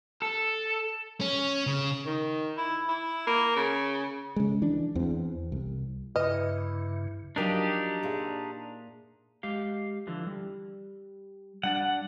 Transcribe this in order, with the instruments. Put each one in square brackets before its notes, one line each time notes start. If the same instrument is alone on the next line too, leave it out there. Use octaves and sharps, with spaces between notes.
[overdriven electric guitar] A4
[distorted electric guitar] C#4
C#3
[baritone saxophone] D#3
E4
E4
A#3
C#3
[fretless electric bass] C#3 G#3
E3 D4
E2 C4
C2
[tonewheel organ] G2 C#3 [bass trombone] E4 [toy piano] B4 [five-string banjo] D#5
[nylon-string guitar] F3 F#3 A#4 [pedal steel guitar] D4 D#4 G4
[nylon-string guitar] A#2 G#4 E5
[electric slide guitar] G#3 G4 F5
D3 E3 F3
G3
[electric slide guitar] G3 D4 D5 [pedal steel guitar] F#5